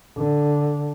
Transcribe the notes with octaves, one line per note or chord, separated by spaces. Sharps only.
D3